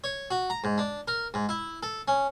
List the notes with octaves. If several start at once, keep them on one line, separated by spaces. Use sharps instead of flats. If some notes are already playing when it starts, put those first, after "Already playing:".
C#5
F#4
A#5
G#2
D4
A#4
G#2
E4
A4
C#4